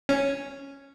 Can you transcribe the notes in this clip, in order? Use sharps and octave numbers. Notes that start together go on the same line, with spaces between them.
C#4